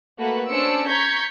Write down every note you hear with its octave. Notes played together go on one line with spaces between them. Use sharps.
A3 A#3 F#4 B4
C#4 D4 C5 E6 C#7 D7
A#5 C#6 G6 G#6 B6